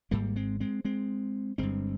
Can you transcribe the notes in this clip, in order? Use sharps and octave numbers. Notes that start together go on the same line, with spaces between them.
G#1 G#2 G3 A#3
G#3 C4
G#3 C4
G#3 C4
G1 G2 G#3 C4